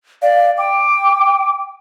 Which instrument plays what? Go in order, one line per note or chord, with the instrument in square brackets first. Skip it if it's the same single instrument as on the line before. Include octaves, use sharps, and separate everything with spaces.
[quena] D5 [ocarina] F5
[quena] G5 [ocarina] D6